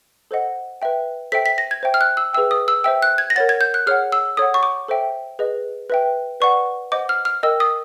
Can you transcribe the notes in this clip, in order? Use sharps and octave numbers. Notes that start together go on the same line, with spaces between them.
A4 C5 D#5 F#5
B4 E5 G5
A4 C5 E5 G5 B6
B6
A#6
G#6
C5 E5 G5
F6
F#6
E6
G#4 B4 E5 G5 E6
D#6
E6
C5 E5 G5 E6
F#6
G#6
A#6
A#4 C#5 F#5 A6
G#6
G6
F#6
G#4 C#5 F#5 F6
E6
A4 C#5 F#5 D#6
C#6
D6
A4 C5 E5 G5
G#4 B4 D#5
B4 E5 G5
B4 D5 F#5 C#6
C5 D#5 F#5 D6
F6
F6
A#4 D#5 G5 E6
D#6